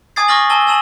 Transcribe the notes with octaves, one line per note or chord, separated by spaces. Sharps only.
G#5 D6 D#6 G#6 A6 C7
C#6 D6 F6 A6 A#6 F#7
G#5 A5 E6 G7
G#5 A5 E6 E7 F#7